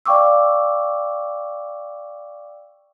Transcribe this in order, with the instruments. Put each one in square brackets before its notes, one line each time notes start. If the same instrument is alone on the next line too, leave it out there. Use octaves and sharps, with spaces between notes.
[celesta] D5 F5 G5 C#6 D6 E6